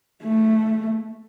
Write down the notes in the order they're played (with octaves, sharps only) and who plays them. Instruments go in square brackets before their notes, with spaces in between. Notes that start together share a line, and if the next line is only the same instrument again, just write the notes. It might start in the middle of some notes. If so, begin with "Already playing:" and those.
[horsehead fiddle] A3